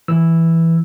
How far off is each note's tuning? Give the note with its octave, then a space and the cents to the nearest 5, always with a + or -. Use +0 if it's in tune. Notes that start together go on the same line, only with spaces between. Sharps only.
E3 +0 E6 +0